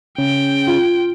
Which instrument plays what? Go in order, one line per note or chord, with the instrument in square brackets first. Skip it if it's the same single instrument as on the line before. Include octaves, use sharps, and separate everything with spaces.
[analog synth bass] C#3 [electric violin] G5
[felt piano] F4